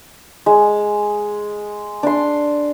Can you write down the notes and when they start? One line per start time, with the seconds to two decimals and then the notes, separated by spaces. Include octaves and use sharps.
0.46 G#3
2.03 D4 C6